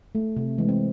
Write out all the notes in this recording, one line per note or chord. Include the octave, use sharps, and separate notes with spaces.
A3
C3
E3 G#3
C4